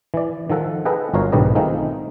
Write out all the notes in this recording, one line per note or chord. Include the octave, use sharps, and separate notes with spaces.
E3 D5
D#3 F3 A4 F#5 A5
G#4 A4 B4 D#5 F#5 G5
G1 F4 F#4 A#4 C#5 F5
B1 G#2 D3 G4 B4 D#5
D#3 A3 C4 D#4 F4 G#4